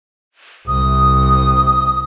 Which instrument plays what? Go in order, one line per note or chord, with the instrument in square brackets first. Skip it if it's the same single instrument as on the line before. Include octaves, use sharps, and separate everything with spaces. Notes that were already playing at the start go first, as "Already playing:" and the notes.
[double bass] C2 [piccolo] D#6